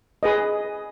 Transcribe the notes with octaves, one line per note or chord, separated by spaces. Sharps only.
G#4 B4 D#5